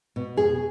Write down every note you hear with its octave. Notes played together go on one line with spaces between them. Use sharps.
B2
F2 G#4